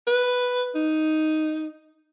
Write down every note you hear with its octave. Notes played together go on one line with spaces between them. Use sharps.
B4
D#4